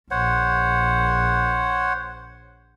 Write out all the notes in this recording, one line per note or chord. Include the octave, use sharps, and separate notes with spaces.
A#1 C5 C#5 F#5